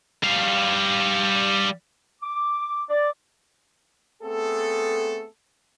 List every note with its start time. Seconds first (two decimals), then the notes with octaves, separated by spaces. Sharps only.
0.23 G3 F5
2.22 D6
2.89 D5
4.23 A3 B3 C4 G#4 A4